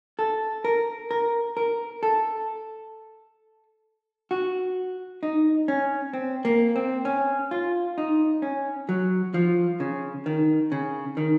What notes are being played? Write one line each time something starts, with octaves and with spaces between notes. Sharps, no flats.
A4
A#4
A#4
A#4
A4
F#4
D#4
C#4
C4
A#3
C4
C#4
F4
D#4
C#4
F#3
F3
C#3
D#3
C#3
D#3